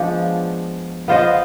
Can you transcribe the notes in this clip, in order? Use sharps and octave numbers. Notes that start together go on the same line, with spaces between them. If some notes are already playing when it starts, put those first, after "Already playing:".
Already playing: F3 G#3 B3 D4
B3 F4 C5 D#5